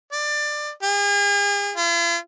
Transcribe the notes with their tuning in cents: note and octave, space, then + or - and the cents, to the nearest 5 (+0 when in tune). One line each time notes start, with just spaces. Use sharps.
D5 +20
G#4 -40
F4 -45